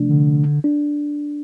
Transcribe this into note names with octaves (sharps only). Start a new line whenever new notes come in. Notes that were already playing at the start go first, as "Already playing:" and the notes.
Already playing: C3 F3 A3 D4
D3
D4